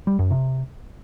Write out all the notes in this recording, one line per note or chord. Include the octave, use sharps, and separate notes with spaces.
G3
F#2
C3